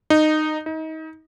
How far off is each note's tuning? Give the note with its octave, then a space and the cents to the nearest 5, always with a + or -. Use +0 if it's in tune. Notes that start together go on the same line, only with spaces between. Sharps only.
D#4 -15
D#4 +30